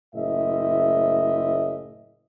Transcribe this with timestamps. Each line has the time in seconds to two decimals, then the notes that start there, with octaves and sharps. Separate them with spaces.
0.14 F#1 A2 D#5 E5